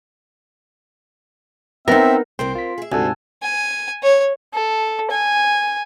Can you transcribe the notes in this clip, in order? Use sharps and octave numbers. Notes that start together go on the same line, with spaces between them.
B3 C4 D#4 A#4 E5
C2 C4 A#4 C5 G5 C6
F4 B6
G#4 E5
D2 G#2 C3 A4 F#5 G#5
G#5
C#5
A4
G#5